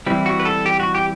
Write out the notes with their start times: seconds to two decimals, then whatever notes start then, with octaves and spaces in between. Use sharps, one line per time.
0.06 E3 G3 C4 E4
0.26 F#4
0.40 B4
0.45 A4
0.66 G4
0.80 F#4
0.95 G4